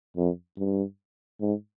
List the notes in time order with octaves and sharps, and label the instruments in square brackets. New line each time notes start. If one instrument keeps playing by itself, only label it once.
[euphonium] F2
G2
G#2